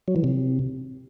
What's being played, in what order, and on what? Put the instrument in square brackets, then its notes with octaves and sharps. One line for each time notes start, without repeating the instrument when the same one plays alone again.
[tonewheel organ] F#3
E3
C3